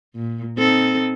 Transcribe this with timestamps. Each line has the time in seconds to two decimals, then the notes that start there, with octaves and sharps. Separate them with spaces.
0.15 A#2
0.57 C4 D#4 A4